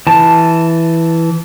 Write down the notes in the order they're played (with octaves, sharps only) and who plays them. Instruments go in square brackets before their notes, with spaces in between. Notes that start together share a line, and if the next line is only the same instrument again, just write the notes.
[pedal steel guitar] E3 A5